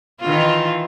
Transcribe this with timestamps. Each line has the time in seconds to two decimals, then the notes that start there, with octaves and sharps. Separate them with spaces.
0.21 D#3 E3 F4